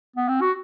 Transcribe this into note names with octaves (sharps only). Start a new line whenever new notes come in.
B3
C4
F#4